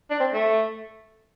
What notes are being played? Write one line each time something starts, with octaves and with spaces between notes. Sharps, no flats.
D4
C4
A3